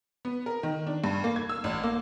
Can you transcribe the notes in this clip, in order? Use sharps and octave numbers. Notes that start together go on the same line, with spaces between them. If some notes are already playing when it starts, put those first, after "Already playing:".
B3
A#4
D#3
D4
G2
A#3
G#6
E6
A1
A#3